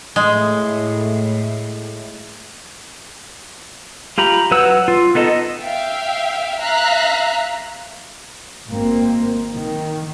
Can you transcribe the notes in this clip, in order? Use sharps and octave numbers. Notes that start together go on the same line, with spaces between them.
A2 G#3
F4 G4 A#5 B5
F#3 B4 F#5 E6
F4
B3 D#4 A4 D#5 A5
E5 F5 G5
E5 F5 A#5 F#6 B6
G#1 A#3 C4
D#3